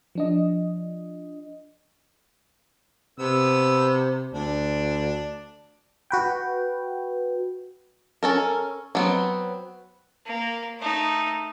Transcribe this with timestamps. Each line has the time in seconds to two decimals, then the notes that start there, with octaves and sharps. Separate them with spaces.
0.15 F3 D4 D#5
3.19 C3 B3 E6
4.34 D2 D4 D5
6.10 F#4 B4 G5
8.23 C#4 A4 A#4
8.95 F#3 B3 C4
10.26 A#3
10.80 A3 D#4